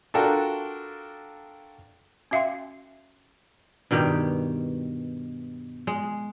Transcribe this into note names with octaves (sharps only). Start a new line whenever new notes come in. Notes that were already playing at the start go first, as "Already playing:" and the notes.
D4 F4 F#4 A4 A#4 G5
C#4 F#4 E5 F5 G5 C6
G2 B2 D#3 G4
G#3